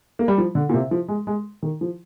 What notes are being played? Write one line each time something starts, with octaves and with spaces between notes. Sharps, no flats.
A#3
G3
F3
D3
A#2
C3
F3
G#3
G#3
D#3
F3